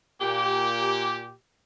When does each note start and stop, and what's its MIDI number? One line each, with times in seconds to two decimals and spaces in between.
0.21 1.32 46
0.21 1.32 67